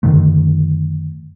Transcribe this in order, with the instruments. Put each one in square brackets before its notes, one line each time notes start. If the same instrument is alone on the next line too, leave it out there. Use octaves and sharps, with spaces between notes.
[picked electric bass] F#2 D3 D#3 A3